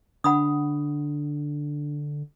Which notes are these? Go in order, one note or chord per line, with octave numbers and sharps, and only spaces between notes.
D3 D4 F#5 B5 D#6